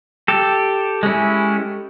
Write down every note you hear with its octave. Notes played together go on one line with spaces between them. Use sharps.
G4 A4
G#3 C#4 E4